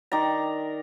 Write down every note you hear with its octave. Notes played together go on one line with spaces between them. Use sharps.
D#3 D5 A#5